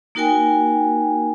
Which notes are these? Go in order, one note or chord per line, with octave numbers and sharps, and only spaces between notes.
A#3 D#4 F#4 A#4 G5 G#5